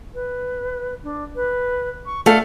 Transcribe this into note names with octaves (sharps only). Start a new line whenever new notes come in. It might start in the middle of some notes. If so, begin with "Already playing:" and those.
B4
D4
B4
C#6
A3 A4 D5 F5